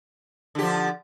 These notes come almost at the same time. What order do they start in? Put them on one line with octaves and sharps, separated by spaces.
D3 G4 F3